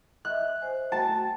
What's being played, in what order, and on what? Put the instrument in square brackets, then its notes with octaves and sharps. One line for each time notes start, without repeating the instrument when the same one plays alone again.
[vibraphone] D#5 E5 [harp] F#6
[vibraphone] C5 G#5
[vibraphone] A3 F#4 G5 [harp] A5